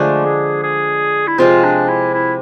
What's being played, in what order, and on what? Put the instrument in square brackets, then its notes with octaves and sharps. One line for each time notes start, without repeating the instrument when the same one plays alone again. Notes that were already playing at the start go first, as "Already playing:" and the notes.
Already playing: [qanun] D3 F3 G#3 D4 [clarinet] A3
[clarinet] G#4
G#4
E4
[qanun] C3 F3 G#3 C4 [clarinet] F4
[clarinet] D4
E4
E4